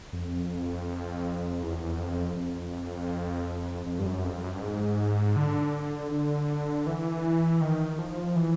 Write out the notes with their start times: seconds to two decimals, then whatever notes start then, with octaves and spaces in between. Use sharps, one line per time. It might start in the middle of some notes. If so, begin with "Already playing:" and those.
0.13 F2
1.62 E2
1.99 F2
2.37 F2
3.86 F2
3.99 G2
4.06 F#2
4.24 F2
4.42 F#2
4.55 G2
4.61 G#2
5.36 D3
6.11 D3
6.87 E3
7.61 D#3
7.99 F3
8.36 E3